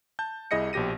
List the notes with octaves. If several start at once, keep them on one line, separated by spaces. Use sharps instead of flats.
A5 G6
C2 E4 G#4 D#5 A#6 C#7
A#1 B2 G4 A#6 D#7